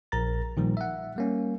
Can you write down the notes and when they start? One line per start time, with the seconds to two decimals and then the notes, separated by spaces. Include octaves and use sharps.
0.12 A#1 A#4 A#5 A6
0.57 A#2 D#3 F3 G3
0.77 E5 F#5
1.16 G3 A#3 C#4